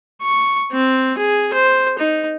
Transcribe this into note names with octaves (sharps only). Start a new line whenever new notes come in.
C#6
C4
G#4
C5
D#4